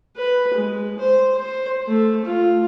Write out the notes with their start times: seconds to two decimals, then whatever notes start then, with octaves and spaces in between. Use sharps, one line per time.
0.17 B4
0.54 G#3
0.99 C5
1.34 C5
1.88 A3
2.25 F4